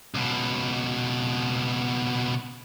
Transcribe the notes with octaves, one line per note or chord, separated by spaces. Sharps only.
C#2 B2